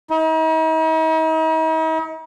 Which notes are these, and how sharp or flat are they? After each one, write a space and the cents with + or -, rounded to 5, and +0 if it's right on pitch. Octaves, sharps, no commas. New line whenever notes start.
D#4 +45